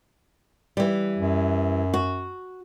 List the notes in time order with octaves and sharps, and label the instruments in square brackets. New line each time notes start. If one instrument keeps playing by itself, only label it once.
[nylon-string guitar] E3 G3
[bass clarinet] F#2
[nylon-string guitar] F#4